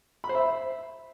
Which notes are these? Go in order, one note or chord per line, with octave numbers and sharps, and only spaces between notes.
B5
C5
E5